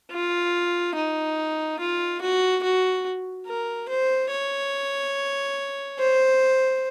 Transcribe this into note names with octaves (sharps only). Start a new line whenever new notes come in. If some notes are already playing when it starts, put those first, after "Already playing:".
F4
D#4
F4
F#4
F#4
A#4
C5
C#5
C5